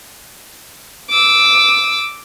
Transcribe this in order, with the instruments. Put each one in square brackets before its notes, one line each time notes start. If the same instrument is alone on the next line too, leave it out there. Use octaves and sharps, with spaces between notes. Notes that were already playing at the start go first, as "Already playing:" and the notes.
[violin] D6 E6